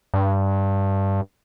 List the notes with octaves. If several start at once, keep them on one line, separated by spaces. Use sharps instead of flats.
G2